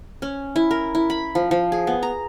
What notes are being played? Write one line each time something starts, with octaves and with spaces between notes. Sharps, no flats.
C#4
E4
A#4
E4
B5
F3
F3
G#4
B3
A#5